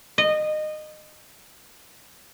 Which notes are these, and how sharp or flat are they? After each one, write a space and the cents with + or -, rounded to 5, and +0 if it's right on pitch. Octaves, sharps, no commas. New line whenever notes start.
D#5 -20